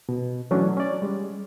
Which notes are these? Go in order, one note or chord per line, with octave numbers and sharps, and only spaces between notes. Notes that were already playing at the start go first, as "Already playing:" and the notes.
B2
E3 F#3 A3 C#4 D4
C#4 D5
G3 G#3